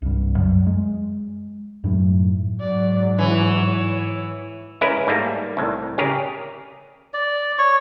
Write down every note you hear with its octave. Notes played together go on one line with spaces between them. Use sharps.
C2 G2
F#2 F#3
G#3
F#2 A2 F#3
G#2 F#3 D5
E3 C#5
G#3 C#4 E4 A#4 B4
G#2 G3 A3 A#3
C2 A2
C#3 G4 G#4 A#4
D5
C#5 C#6